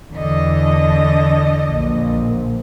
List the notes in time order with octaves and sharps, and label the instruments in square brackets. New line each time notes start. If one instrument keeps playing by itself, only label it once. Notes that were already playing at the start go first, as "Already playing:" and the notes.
[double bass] E2 [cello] D3 D#5
[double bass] A#1